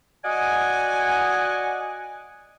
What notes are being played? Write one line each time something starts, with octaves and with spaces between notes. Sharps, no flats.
F#4 D5 D#5 F#5 G#5